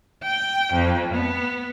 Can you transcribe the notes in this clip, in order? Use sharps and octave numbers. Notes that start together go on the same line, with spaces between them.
G5
F2
B3